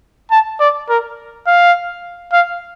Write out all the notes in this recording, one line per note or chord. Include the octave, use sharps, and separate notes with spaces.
A5
D5
A#4
F5
F5